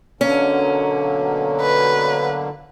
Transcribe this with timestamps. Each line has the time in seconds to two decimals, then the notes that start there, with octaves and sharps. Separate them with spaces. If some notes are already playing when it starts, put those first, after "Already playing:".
0.21 B2 D3 F#3 A#3 C#4
1.61 B4